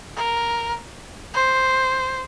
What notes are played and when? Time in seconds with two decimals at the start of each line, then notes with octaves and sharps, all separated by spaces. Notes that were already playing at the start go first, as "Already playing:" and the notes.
0.17 A#4
1.34 C5